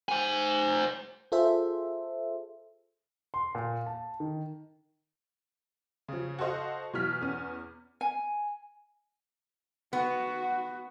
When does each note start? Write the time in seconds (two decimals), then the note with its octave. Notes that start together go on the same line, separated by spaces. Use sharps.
0.09 C5 G#5
1.32 F4 G#4 A4 C5 E5
3.34 C6
3.55 A#2
3.86 A5
4.20 D#3
6.08 C#3 F3
6.39 F#4 A4 C5 D#5 F5
6.93 B2 E3 F#3 F6 B6
7.21 E2 B3 C#4
8.01 G#5
9.93 B3 F#4